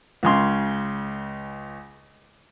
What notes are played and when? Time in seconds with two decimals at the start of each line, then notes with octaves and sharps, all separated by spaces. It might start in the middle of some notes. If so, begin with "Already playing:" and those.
0.23 C#2 C#3 C6